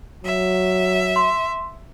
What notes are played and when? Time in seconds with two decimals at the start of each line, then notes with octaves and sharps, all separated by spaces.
0.24 F#3 E5
1.16 C6